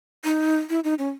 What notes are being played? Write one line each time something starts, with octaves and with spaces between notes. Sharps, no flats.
D#4
E4
D#4
C#4